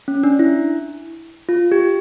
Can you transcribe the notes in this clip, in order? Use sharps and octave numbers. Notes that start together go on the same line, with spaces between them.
C#4
D4
E4
F4
G4